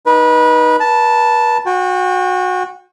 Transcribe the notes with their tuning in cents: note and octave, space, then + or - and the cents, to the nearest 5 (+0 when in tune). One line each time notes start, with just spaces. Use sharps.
D#4 +0 B4 -25
B4 -40 A5 +0
F#4 -20 G5 +20